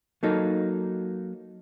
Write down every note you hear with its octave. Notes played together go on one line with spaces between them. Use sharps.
F#3 A#3 D#4 A4